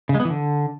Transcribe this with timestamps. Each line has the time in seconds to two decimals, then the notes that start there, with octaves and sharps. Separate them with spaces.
0.09 C#3
0.15 G#3
0.20 B3
0.25 E3
0.30 D3